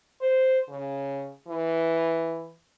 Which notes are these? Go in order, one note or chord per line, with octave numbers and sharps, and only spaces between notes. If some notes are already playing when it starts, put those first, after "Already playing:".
C5
C#3
E3